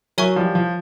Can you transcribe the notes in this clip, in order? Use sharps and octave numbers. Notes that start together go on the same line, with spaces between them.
F#3 A#4 C#5 E5 G#5 C#6
F3 G3
F3